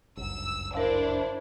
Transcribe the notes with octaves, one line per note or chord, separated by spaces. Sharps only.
G1 C#2 F#2 E6
D4 E4 A#4 C5 F5